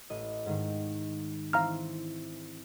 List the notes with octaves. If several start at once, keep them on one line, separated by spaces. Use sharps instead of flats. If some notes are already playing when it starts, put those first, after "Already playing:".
A1 D#5
G#2 D#3
E3 C4 F5 A#5 F6